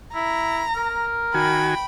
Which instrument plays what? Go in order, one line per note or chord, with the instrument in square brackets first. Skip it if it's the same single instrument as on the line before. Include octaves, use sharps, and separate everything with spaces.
[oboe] E4 [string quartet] A#5
[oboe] A#4
[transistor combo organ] D#3 F#4 G#5 [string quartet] G5 B5